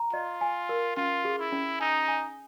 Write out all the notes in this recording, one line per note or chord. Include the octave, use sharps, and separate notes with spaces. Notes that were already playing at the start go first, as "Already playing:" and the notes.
Already playing: A#5
F4 D#5
G#5
A#4
C#4 F4
G#4
E4
C#4
D#4 G#5
G#5